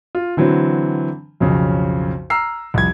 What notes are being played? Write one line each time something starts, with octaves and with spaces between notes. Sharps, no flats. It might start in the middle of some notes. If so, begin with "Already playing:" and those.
F4
D3 E3 F#3 C4
B1 F2 C#3
A#5 E6 F6 C7
C2 F2 G#6